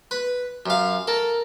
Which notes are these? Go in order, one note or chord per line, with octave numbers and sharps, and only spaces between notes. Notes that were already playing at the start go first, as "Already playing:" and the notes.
B4
F#2 F5
A4 A#4